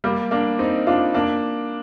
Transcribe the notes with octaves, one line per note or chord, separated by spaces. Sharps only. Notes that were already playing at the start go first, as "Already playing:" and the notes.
G3 A#3
A#3 D4
C4 D#4
D4 F4
A#3 D4